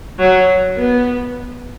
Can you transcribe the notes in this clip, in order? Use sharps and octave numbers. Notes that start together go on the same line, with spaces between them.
F#3
B3